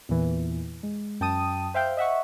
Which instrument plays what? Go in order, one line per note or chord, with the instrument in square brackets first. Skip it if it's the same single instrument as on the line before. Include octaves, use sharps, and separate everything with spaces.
[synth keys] E2 A#2 E3
G#3
F#2 G5 A5 D#6 D#7
C5 E5 F5 G5 G6
D#5 E5 F#5 C#6